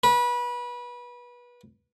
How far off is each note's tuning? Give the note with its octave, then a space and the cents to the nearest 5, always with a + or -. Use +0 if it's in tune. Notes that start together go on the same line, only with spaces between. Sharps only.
B4 -25